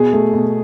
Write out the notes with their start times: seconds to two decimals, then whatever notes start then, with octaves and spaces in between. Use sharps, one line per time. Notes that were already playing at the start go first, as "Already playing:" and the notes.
Already playing: B2 G#4
0.13 A3
0.33 B2